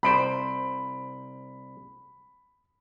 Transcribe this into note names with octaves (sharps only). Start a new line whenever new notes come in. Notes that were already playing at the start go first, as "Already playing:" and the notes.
C2 C5 B5 D7